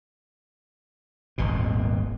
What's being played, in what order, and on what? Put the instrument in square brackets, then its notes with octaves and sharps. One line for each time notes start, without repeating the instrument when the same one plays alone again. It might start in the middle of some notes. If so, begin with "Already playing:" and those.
[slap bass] D#1 G#1 B2